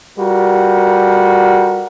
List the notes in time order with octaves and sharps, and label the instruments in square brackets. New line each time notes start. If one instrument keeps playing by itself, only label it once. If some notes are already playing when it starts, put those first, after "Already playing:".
[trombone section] G3 F4 F#4 A4 A#4